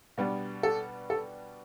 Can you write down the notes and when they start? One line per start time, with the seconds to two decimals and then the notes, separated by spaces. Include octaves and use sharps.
0.18 B2 G3 B3 D4
0.63 A4
1.10 A4